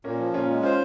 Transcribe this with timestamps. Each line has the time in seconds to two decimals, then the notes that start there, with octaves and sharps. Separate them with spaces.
0.04 A#2 A#3 C#4
0.19 F3
0.34 A#2 C#4 F4
0.49 G#3
0.63 C#4 F4 C5